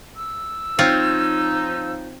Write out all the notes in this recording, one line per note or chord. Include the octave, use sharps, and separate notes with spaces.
E6
F3 C4 D#4 F4 C#5